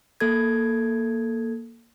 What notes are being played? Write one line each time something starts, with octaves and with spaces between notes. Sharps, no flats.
A#3 A4 G#6